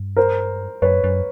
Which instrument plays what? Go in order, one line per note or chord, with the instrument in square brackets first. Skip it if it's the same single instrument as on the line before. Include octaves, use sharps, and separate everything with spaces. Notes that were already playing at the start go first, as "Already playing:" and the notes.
Already playing: [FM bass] G2
[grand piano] A#4 C5
[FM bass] F#2 [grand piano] B4 C#5
[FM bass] F#2